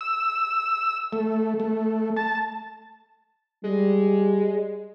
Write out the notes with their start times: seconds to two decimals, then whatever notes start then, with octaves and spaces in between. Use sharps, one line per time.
0.01 E6
1.13 A3
1.60 A3
2.17 A5
3.64 G3 G#3